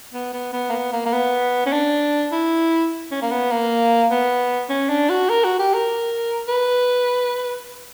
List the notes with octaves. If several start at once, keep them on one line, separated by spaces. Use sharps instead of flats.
B3
B3
B3
A#3
B3
A#3
A#3
B3
C#4
D4
E4
C#4
A#3
B3
A#3
B3
C#4
D4
F#4
A#4
F#4
G4
A#4
B4